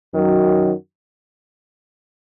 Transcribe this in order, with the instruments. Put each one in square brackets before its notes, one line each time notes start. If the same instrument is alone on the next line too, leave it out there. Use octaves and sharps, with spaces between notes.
[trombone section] F#2 D#3 F#3